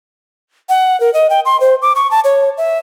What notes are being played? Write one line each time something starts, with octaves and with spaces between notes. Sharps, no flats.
F#5
A#4
D#5
G5
C6
C5
D6
C#6
A5
C#5
E5